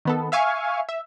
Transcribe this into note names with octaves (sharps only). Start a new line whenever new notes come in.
D#3 B3 A4
E5 F5 G#5 C#6
E5